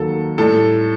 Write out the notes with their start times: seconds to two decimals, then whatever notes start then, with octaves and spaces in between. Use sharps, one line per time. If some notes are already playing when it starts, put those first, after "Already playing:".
Already playing: D#2 D#3 F#3 A4
0.38 A2 G3 A4